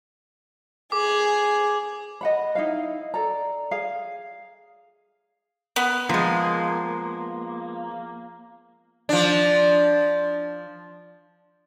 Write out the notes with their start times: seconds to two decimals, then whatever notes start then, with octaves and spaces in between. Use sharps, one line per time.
0.92 G#4 D6
2.21 D#5 F#5 B5
2.55 D#4 E4 F5
3.14 A4 D5 A#5
3.71 G#4 F5
5.76 B3
6.09 F3 G#3 A#3
9.09 F3 D4